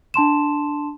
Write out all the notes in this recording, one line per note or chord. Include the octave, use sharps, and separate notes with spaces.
D4 A5 C6 E7